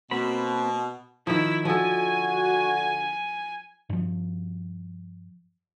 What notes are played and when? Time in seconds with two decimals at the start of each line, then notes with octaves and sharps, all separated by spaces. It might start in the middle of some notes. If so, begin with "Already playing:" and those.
0.11 B2 A#3 C4 B5
1.27 D#3 F3 E4 E6
1.65 D3 F3 F#4 A4 G#5
3.90 G2 F3